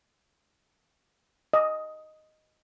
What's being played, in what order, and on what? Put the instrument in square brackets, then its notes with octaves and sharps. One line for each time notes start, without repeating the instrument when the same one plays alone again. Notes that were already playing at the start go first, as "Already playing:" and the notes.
[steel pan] D#5